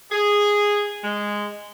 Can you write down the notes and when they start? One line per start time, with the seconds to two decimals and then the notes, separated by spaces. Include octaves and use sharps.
0.12 G#4
1.03 G#3